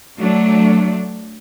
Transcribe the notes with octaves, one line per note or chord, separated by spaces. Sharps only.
F#3 A3 D4